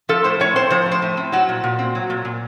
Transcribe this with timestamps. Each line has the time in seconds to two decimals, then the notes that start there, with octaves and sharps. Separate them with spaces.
0.09 F3 A4
0.24 A2 C5
0.40 A2 C#5
0.56 C4 C5
0.70 F3 C5
0.86 A2
0.92 C5
1.02 A2
1.17 C4
1.32 F#3 F#4
1.49 A#2
1.64 A#2
1.79 C4
1.95 F#3
2.10 A#2
2.25 A#2